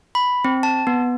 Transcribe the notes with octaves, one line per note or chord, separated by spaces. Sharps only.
B5
C4
A5
B3